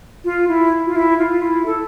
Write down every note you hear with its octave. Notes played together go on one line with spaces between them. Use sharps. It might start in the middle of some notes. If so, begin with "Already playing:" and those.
F4
E4
F4
E4
F4
E4
A4